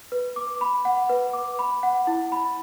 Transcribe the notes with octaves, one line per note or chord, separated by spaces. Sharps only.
B4
D6
B5
F#5
B4
D6
B5
F#5
E4
B5